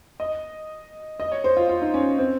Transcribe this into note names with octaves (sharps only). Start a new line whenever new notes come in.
D#5
D#5
C#5
C5
F4
F4
D#4
C#4
C4